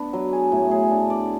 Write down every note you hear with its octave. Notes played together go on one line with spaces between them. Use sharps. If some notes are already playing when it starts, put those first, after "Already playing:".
Already playing: B3 D4
F#3
G#4
A2
G#4
D4
D5